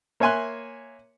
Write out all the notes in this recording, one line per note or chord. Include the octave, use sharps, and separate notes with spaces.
A#3 C#5 E5 G#5 C6 F#6